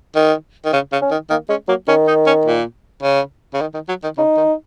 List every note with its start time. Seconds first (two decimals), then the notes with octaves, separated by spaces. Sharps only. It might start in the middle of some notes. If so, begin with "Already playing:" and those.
0.16 D#3
0.65 D#3
0.73 C#3
0.92 C#3
1.02 C#4
1.11 D#3
1.30 D#3 A#3
1.49 G#3 C#4
1.68 F#3 A#3
1.88 D#3 C#4
2.08 D#4
2.26 C#4
2.45 A#2
3.03 C#3
3.54 C#3
3.61 D#3
3.74 D#3
3.89 F#3
4.04 D#3
4.17 C#3 D#4
4.37 D#3